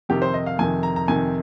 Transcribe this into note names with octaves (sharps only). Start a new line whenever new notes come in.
F2 C3 D#3 G4
C5
D#5
F5
F2 C3 D#3 G#5
A#5
A#5
F2 C3 D#3 G#5